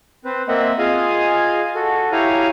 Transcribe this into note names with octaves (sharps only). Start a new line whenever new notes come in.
C4 B4 C5
A#3 C4 D#5 E5 F#5
F4 G#4 D#5 F5 G#5 D#6
F#4 A4
E4 G4 C#5 F5 G#5 A#5